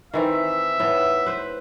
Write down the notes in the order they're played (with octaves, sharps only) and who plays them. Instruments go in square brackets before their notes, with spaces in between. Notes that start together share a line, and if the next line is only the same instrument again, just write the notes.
[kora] D#3 E3 C4 [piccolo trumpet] E5
[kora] A2 B3
B4 C5